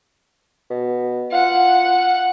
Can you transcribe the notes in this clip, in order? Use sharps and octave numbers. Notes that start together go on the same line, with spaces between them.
B2
F4 F#5